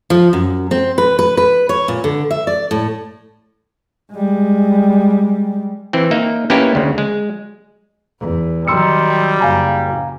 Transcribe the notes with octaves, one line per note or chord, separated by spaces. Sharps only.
F3
F#2
C4
B4
B4
B4
C#5
A#2
D3
E5
D5
A2
G3 G#3
E3 C4
A#3 D#4 E5
A#3 B3 C#4 D#4 E4 G4
D2 C#3
G#3
E2
D#3 F#3 G3 C6 E6 C#7
F#1 F5 G#5 A#5